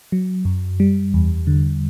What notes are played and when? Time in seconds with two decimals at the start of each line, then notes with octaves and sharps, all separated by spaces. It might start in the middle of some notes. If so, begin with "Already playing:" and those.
0.12 F#3
0.45 F#2
0.80 G3
1.14 E2
1.47 D3